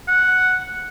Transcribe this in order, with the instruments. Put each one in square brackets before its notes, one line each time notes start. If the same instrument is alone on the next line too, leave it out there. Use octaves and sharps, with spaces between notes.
[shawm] F#5